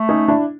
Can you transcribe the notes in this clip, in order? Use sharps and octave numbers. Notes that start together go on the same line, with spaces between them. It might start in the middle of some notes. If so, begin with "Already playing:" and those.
Already playing: A3
C#4 D#4
D4 E4